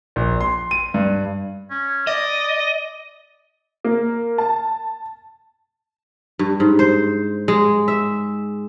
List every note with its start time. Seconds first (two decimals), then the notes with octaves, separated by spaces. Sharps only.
0.16 A#1
0.41 C6
0.71 D#7
0.94 G2
1.70 C#4
2.07 D5 D#5
3.84 A#3
4.38 A5
6.39 G2
6.60 G#2
6.79 C5
7.48 G#3
7.88 E5